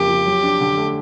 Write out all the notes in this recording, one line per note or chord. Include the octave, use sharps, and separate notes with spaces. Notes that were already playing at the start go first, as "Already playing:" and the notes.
Already playing: F2 C#3 A#3 G4
F3
F#3
D4
D3
A3